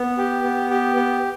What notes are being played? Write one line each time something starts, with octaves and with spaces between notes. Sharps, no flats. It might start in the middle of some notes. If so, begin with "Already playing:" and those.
Already playing: B3
G4
B3
G4
B3